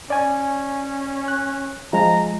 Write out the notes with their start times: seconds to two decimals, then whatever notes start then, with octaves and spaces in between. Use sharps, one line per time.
0.10 C#4 D5 G#5
1.28 F#6
1.93 F3 G#3 A#5